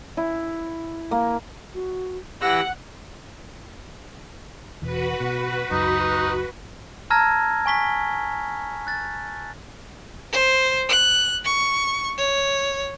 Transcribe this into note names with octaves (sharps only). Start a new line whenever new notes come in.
E4
A#3
F#4
E3 G4 F#5 E6 A#6
E1 E3 F#4 B4
B2
C#2 F#2 D#4
A5 A#5 E6 F6 G#6 A#6
G#5 C#6 B6 G7
F#6 A6
C5
F#6
C#6
C#5